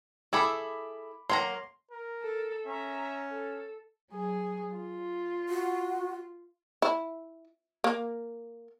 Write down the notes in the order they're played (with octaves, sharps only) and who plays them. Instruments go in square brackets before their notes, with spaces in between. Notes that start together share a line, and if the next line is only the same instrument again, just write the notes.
[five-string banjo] E4 G#4 A4 [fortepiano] B5 D6
[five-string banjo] F#3 A#3 A#5 [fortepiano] C6
[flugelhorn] A#4
[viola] A4
[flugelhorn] C#4 [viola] E5 A#5
[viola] A4
[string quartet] F#3 G#4
F4
[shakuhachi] F#4
[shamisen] E4
A#3